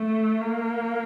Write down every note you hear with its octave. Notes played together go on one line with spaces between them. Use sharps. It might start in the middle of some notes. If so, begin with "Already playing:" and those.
Already playing: A3
A#3